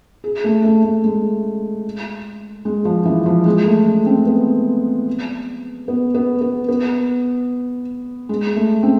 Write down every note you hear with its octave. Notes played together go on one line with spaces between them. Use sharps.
G#4
A3
A3
A3
G#3
G#3
F3
E3
F3
G#3
A3
A3
C4
B3
B3
B3
B3
B3
G#3
A3
C4